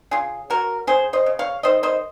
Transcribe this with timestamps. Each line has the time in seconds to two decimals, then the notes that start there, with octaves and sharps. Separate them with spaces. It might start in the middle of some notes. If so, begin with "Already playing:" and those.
0.11 C#3 F4 G#4
0.50 F#3 F#4 A#4
0.87 C#3 G#4 C5
1.13 C5 D#5
1.26 C#3
1.39 C#5 F5
1.63 D#3 C5 D#5
1.83 C5 D#5